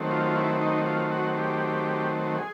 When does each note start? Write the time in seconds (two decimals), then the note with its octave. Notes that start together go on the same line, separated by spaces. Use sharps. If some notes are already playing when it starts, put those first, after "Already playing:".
Already playing: D#3 F#3 A3 C4
0.11 F4
0.26 F4
0.36 E4
0.62 D#4
0.86 F4
1.12 F#4
1.37 G4
2.38 G#4